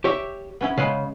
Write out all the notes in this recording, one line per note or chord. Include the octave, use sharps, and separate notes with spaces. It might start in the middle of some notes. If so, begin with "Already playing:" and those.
G4 C#5 E5
B3 C#4 E4
C#3 G#3 B4 F5